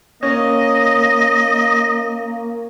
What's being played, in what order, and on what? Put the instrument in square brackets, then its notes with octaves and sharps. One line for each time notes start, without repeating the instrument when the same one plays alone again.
[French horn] A#3 [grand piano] C#4 [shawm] D#5